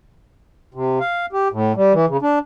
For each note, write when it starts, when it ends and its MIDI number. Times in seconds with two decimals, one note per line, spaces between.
0.74 0.99 48
1.00 1.26 77
1.33 1.48 67
1.52 1.72 45
1.76 1.93 55
1.93 2.06 52
2.08 2.17 49
2.22 2.39 62